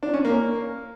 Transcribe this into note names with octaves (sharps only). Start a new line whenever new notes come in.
D4
C#4
A#3